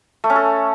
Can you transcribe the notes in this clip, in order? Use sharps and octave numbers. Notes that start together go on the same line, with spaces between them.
A3
C#4
A4